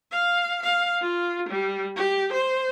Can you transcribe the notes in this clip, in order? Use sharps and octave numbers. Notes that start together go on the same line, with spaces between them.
F5
F5
F4
G3
G4
C5